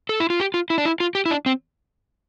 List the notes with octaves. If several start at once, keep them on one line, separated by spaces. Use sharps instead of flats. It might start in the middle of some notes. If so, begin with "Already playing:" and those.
A4
E4
F4
G4
F4
E4
D4
E4
F4
G4
E4
D4
C4